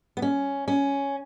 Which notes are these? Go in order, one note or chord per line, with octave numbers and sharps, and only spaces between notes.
B3
C#4
C#4